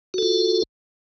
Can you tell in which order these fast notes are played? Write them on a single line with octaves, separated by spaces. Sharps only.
F#4 A4 F4